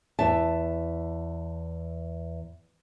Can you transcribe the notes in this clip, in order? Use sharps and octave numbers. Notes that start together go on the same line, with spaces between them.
E2 E5 A5